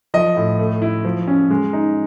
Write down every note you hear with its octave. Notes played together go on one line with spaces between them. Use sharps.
F3 D#5
A2
A3
E4
F3
C#4
G#3
D#4